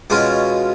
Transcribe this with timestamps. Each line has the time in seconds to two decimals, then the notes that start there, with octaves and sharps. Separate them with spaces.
0.10 B2 G#3 C#4 F4 D6